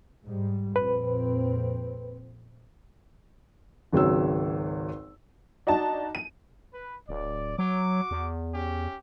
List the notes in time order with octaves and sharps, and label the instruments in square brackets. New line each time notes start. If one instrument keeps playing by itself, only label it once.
[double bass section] G#2 G3
[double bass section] A#1 F2 C4 [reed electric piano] B4
[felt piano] G#1 C#2 F#3 E6
[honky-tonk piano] D4 D#4 F#4 A5
D#7
[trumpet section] B4
[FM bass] D1 [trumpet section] D5
[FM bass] F#3 [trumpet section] F#4 D6
[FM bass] E2
[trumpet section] C#4 G4